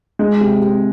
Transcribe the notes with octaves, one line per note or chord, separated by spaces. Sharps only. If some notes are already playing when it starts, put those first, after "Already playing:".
G#3
C3
C3